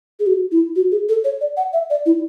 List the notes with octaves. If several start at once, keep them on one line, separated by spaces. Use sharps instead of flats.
G#4
F#4
E4
F#4
G#4
A4
C#5
D5
F#5
E5
D5
E4